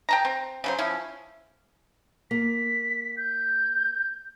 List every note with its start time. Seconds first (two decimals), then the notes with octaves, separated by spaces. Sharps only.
0.09 G5 A5 A#5
0.25 C4
0.64 C#3 F#3 C5
0.78 F3 C#4 E4
2.31 A#3 B6
3.17 G6